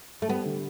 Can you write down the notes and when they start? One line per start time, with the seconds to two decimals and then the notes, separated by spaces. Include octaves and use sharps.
0.22 A3
0.29 G3 B3
0.45 D3